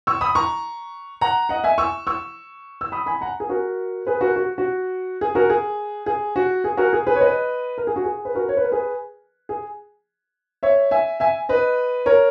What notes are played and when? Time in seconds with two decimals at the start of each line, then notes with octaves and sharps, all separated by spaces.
0.07 C#6 E6
0.21 B5 D#6
0.35 A#5 C#6
1.21 F#5 A#5
1.49 D#5 F#5
1.64 E5 G#5
1.78 C#6 E6
2.07 C#6 E6
2.81 E6
2.92 B5 D#6
3.06 G#5 B5
3.21 F#5 A#5
3.40 G#4
3.49 F#4 A#4
4.07 G#4 B4
4.21 F#4 A#4
4.36 F#4
4.58 F#4
5.21 G#4
5.35 F#4 A#4
5.50 G#4
6.06 G#4
6.36 F#4
6.64 G#4
6.77 F#4 A#4
6.93 G#4
7.07 G#4 B4
7.16 C#5
7.21 B4 D#5
7.78 A#4
7.87 G#4
7.96 F#4
8.04 G#4
8.25 B4
8.35 F#4 A#4
8.49 C#5
8.57 B4
8.64 A#4
8.72 G#4 B4
9.49 G#4
10.63 C#5 E5
10.91 E5 G#5
11.20 E5 G#5
11.49 B4 D#5
12.06 A#4 C#5